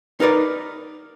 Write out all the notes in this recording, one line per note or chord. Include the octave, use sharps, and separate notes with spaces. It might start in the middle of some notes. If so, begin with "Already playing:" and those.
D#4 A#4 B4 D5